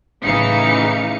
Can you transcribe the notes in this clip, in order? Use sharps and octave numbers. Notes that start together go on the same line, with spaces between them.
A1 C#3 E3 D#4 F5 C#7